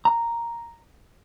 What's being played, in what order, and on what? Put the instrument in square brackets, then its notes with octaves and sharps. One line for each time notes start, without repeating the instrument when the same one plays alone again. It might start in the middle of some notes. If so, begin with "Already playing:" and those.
[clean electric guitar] A#5